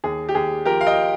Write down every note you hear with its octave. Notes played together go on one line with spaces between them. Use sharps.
D#2 G#4
G4
D#2 G#4
F3 G4 A#4
F5
D#5 G5